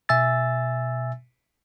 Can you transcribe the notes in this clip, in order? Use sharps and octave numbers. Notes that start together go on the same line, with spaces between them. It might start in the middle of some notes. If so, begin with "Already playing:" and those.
B2 E5 G#5 E6 A6